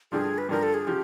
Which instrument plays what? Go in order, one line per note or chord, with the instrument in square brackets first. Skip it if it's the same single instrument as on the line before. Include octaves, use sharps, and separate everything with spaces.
[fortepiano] G2 D3 F3 [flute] G#4
[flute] B4
[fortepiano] G2 D3 F3 [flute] A#4
[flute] A4
G#4
[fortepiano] C#3 F3 [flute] G4